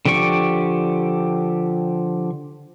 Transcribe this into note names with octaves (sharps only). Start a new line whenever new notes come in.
D3 F3 G4 D5 C#6